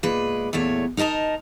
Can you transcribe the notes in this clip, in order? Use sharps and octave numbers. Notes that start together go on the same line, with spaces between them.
A#2 G#3 B4
E2 A#2 A3 C#5
D#4 A#4 D#5 A5 A#5